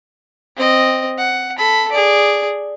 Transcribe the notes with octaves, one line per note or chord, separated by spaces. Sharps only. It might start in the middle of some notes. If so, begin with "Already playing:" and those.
C4 D#5
F#5
A4 B5
G#4 D5